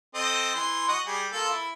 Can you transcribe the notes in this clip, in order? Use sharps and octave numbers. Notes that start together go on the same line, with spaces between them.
C4 A4 D#5
E3 C6
F#4 D#5 F#5
G3 G#4
A#3 F4 A4
E4